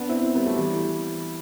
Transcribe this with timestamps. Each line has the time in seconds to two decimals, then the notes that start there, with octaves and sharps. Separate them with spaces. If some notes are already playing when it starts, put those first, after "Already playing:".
Already playing: B3 D4
0.09 C4 E4
0.35 G3 B3
0.46 F#3 A3
0.56 E3 G3